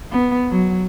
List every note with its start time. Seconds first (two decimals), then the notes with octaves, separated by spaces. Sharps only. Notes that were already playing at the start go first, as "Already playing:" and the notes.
0.11 B3
0.51 F#3